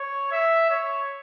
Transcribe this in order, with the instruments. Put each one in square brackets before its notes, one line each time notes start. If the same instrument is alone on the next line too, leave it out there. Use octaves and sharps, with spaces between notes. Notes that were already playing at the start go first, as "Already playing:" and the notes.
Already playing: [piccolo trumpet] C#5
E5
C#5